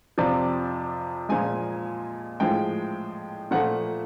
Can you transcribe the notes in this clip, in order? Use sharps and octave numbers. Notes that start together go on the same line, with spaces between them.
F2 C3 F3 D5
A#2 F3 G#3 G#5
A2 F3 G#3 G5
A#2 F3 A3 F#5